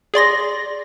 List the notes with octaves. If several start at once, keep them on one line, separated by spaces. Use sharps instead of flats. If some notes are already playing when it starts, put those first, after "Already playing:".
G#4 D5 C6 A#6